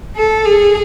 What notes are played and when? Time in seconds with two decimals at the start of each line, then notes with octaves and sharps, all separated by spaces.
0.16 A4
0.45 G#4